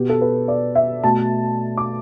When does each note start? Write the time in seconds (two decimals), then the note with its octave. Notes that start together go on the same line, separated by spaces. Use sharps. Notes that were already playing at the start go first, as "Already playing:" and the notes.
Already playing: B2 B3 G4
0.09 A4
0.21 B4
0.48 D5
0.75 E5
1.04 B2 A3 A5
1.77 D6